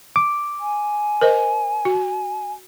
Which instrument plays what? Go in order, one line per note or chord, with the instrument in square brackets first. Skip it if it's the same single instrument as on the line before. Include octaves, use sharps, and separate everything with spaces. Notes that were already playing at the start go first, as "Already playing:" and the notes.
[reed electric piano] D6
[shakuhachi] G#5
[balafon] A#4 C5 D#5
F#4